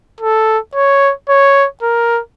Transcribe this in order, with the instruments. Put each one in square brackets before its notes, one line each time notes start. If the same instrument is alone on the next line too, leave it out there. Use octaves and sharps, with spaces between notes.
[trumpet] A4
C#5
C#5
A#4